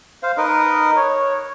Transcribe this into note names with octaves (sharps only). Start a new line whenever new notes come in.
C5 F5
D#4 A#4 B4 D#5
C#5